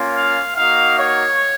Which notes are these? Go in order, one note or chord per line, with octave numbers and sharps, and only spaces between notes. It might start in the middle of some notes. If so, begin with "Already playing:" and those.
Already playing: A#3 C#4 F4
F5
A#3 D#4 F#4 F5
C#5